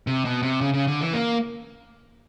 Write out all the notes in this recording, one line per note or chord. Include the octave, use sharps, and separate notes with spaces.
C3
B2
C3
C#3
C#3
D3
E3
A#3